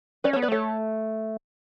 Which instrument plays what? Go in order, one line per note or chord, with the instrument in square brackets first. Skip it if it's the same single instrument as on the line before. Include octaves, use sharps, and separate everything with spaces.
[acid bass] C#4 [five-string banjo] B4 D5
[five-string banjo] A4 C#5
[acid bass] B3
[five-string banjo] B4 D5
[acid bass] A3 [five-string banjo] A4 C#5